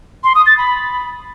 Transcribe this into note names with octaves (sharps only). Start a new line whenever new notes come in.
C6
D#6
A6
B5